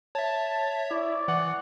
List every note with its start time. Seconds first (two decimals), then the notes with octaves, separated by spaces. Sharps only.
0.15 C#5 E5 A5
0.91 E4 D5
1.28 E3 F#5